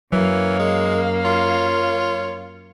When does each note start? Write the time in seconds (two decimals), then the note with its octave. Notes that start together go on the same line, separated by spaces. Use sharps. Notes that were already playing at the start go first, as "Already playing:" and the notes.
0.13 F#2 E3 F#3 A#3 C#5 F5
0.59 G#3
1.25 F4 C#5